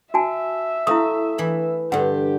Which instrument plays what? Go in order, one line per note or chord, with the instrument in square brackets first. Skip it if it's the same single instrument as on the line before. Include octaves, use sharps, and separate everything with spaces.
[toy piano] F#4 G#5 A5 [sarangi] E5
[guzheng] A3 [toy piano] E4 F5 D#6
[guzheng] E3 B5
[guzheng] G2 D3 [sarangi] G4 [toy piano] F#5